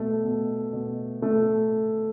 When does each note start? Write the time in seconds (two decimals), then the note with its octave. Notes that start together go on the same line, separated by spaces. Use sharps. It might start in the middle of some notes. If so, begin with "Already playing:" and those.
Already playing: B2 A3
0.24 B2
0.73 B2
1.22 B2 A3